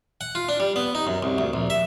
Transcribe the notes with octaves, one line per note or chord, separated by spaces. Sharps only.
F#5
F4
D4
G3
B3
D#4
F#2
C2
D2
A#1
E5